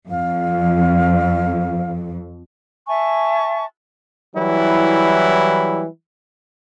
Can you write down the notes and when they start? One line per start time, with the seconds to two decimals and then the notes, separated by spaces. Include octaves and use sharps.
0.10 F2 F5
2.87 E5 G#5 A5 C#6
4.35 E3 F#3 G3 E4